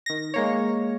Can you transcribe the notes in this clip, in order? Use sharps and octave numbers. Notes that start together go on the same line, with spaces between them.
D#3 A#6
G#3 A#3 C#5